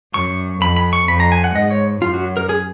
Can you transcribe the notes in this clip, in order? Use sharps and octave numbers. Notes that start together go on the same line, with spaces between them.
F#2 C#6
F2 B5
B5
C#6
F2 B5
A#5
G#5
F#5
G#2 D#5
C#5
F#2 F4
F#4
A#4
G#4